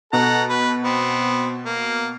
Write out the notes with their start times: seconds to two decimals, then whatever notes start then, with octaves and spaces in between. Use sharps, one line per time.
0.13 B2 A4 F#5 A#5
0.49 B4
0.84 B3 C4
1.66 A#3